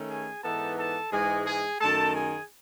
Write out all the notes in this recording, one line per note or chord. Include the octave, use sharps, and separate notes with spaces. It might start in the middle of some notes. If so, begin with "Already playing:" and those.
Already playing: D#3 A3 C#4
G#4 G#5
G#2 E3 B3 D#4 A4 A5
A4 A5
G#2 E3 G#3 G#4 G#5
G#4 G#5
F#2 D#3 A3 A4 A5
G#4 G#5